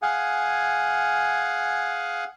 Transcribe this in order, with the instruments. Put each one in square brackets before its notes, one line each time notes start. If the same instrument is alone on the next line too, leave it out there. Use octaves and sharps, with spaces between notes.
[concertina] G#4 F5 F#5 G#5